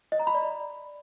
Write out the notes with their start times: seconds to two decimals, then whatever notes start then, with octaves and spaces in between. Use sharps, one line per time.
0.12 D#5
0.19 A#5
0.27 B5
0.34 D5